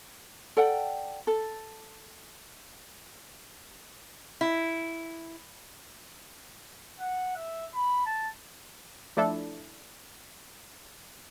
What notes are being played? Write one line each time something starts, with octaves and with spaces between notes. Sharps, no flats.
A4 D5 F#5 G5
A4
E4
F#5
E5
B5
A5
F3 A3 D4 E4 A4